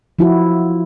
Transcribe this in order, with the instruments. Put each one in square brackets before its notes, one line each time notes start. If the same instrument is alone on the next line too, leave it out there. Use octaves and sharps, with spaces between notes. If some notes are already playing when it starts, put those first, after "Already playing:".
[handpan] F3 E4 F#4